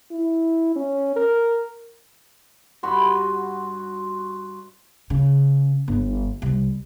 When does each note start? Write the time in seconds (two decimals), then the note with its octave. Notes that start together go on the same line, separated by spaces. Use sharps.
0.12 E4
0.76 C#4
1.16 A#4
2.83 G2 F#4 B5 C6
5.10 C#3
5.88 G1
6.42 C2